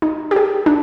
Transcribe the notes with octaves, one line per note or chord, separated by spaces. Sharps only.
D#4
G4
G#4
D4